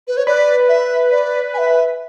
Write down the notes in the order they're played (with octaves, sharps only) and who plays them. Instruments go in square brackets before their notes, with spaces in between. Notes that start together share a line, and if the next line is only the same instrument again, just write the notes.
[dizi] B4
C#5
[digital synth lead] B4 [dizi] D5
[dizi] E5
D5
G#5
E5